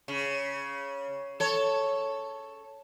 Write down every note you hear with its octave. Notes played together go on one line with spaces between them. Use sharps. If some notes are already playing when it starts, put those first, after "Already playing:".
C#3
A4 C#5